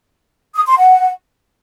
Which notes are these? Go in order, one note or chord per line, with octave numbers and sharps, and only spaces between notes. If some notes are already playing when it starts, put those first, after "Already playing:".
D#6
C6
F#5